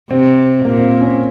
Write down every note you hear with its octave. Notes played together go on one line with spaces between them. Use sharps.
C3 C4
A#2 A#3
C4
C#4
C4